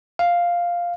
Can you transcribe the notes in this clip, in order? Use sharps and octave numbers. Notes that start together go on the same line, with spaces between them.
F5